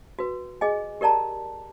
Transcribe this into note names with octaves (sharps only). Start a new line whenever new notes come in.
F#4 B4
G#4 D#5 G#5
G4 A#4 D5 A5 A#5